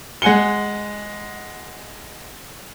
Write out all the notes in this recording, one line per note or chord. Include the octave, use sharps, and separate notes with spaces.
G#3 F#5 G#5 C#7 G7